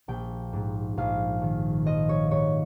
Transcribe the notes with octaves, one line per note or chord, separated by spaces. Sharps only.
A#1 G5
G#2
A#1 F5
D#3
F3 D#5
C#5
G#2 C#5